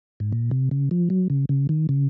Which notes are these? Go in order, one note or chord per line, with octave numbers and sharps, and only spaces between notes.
G#2
A#2
C3
C#3
F3
F#3
C#3
C#3
D#3
C#3